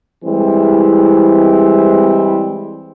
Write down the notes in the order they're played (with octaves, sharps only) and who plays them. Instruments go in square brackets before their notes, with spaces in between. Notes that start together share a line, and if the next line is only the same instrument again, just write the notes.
[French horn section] E3 G3 G#3 C4 E4